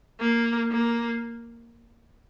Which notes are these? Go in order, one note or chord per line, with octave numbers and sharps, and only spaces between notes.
A#3
A#3